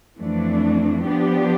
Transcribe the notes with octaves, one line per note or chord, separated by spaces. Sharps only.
F2 E3 A3 D4
F3 B3 D4 G4